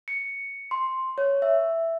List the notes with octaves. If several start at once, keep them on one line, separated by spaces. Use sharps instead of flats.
C#7
C6
C#5
E5